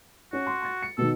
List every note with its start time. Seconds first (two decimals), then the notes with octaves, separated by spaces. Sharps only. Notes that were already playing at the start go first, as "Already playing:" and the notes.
0.33 C#4 F#4
0.47 C6
0.62 C6 A6
0.82 C#7
0.98 B2 D#3 A4